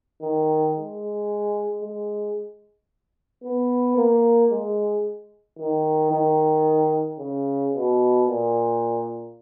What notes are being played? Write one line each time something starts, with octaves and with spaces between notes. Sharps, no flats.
D#3
G#3
G#3
B3
A#3
G#3
D#3
D#3
C#3
B2
A#2